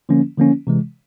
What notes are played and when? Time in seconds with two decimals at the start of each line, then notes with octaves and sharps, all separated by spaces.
0.09 D3 F3 A#3 C#4
0.38 D3 F3 A#3 C#4
0.67 C3 E3 G#3